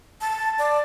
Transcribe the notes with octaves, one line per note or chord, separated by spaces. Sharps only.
A5
D5